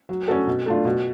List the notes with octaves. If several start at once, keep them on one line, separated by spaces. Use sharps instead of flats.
F#3
C#4 F#4 A4
B2
A3 D4 F4
B2